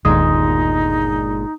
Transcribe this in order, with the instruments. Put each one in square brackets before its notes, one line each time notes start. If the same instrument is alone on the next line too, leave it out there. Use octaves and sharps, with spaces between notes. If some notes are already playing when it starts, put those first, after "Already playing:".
[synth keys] G1 A#2 G#3 [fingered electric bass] D#2 [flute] D#4 [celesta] D#6